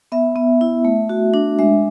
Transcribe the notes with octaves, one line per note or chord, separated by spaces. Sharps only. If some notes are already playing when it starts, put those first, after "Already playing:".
B3 E5
B3
E4
A3
F#4
D4
G#3 E5